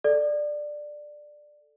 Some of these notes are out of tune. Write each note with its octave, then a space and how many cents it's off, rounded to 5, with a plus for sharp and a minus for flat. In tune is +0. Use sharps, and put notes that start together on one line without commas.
A4 +0 D5 +10